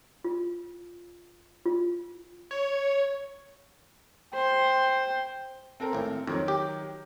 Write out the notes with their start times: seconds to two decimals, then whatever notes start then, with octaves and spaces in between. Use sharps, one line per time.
0.25 F4
1.66 F4
2.51 C#5
4.34 C5 G5 C6
5.80 C4 A4 A#4
5.93 G#1 A2
6.27 F2 D#3 F#3
6.48 G4